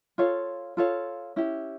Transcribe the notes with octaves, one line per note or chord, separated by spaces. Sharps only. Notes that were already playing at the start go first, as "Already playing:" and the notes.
F4 A4 C#5 F5
F4 A4 C#5 F5
C#4 E4 G4